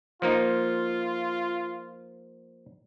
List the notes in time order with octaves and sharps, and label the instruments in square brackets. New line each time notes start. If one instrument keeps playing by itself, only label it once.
[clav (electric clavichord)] F3 A#3 D#4 [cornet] F4